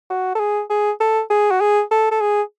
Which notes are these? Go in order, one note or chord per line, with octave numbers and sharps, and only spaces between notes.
F#4
A4
G#4
G#4
A4
G#4
F#4
G#4
A4
A4
G#4